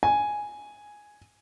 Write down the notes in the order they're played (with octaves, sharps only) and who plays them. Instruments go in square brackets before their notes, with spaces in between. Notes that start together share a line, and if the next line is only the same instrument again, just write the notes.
[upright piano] G#5